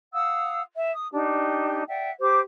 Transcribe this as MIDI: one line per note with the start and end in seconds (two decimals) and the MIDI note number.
0.14 0.60 77
0.14 0.60 78
0.14 0.60 87
0.14 0.60 88
0.75 0.92 76
0.94 1.08 87
1.12 1.83 62
1.12 1.83 63
1.12 1.83 67
1.89 2.10 74
1.89 2.10 76
1.89 2.10 78
1.89 2.10 79
2.20 2.41 67
2.20 2.41 72
2.20 2.41 86